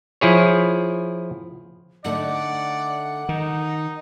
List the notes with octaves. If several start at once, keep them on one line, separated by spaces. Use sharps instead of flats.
F3 E4 G#4 C#5
D3 A3 D#4 D5 F#5
D#3 D#4